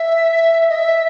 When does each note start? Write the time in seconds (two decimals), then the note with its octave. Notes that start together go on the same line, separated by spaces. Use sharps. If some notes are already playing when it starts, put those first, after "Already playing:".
Already playing: E5
0.69 D#5
0.76 E5